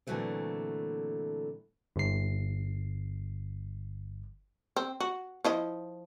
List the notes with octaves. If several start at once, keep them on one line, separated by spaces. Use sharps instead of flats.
A#2 D3 E3 F#3 A3 C4
G1 C7
C4
F#4
F3 E4 D#5